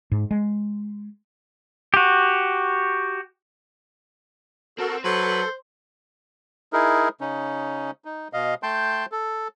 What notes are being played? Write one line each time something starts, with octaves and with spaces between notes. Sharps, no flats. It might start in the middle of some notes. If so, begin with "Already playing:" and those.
G#2
G#3
F#4 G4
C4 F#4 A4 A#4
F#3 A4 B4 C5
D#4 E4 G#4 A#4
C#3 C#4 D#4
D#4
B2 D#5 F5
A3 G5 A5 C6 G6
A4